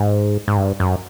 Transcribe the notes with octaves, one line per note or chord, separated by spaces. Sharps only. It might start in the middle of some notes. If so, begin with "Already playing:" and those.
Already playing: G#2
G#2
G2
F#2